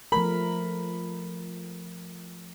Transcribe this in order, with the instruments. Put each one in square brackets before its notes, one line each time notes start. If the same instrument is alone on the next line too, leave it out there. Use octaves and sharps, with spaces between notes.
[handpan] F3 A3 A#4 [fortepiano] B5